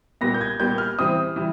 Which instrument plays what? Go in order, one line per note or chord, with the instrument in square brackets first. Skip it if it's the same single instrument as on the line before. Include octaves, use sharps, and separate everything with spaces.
[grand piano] A#2 G3 B3 A#6
G6
G#6
A#2 G3 B3 G6
F6
E3 G3 C4 D#6
E3 G3